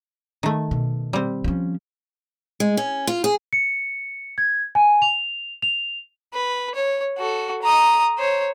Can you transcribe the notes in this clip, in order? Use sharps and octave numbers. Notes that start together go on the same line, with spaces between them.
D#3 A3
B2
G3 C4
F3 C#4
G#3
C#4
F4
G#4
C#7
G#6
G#5
F7
F7
B4
C#5
F#4 A4
A#5 D#6
C5 C#5